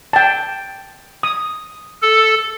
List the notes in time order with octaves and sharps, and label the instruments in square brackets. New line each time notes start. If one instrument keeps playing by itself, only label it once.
[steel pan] G5 A5
D#6
[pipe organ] A4